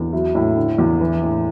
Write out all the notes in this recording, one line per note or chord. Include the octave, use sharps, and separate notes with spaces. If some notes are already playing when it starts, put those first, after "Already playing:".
Already playing: E2
F#3 E4
A2 E4
D3
E2
E3
A2